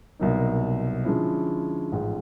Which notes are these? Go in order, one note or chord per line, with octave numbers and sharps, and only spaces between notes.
C2 B2 F#3 A#3 D#4
D3 F3 G#3 C#4 E4
A1 G#2 F3